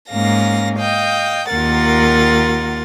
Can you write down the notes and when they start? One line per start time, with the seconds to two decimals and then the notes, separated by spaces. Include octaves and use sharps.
0.11 G#2 A#3 C#4 F5 A#6
0.80 D#5 F5 G5
1.50 D#2 A#3 F4 A#4 F#5 A6